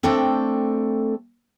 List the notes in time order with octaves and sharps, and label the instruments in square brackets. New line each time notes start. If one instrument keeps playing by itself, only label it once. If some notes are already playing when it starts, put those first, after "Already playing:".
[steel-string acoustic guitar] A3 C4 D4 A4 G5